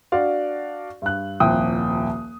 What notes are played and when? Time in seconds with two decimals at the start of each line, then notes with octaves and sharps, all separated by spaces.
0.12 D4 F#4 D5 F5
1.02 G2 F#6
1.40 D#1 C2 F3 G5 D#6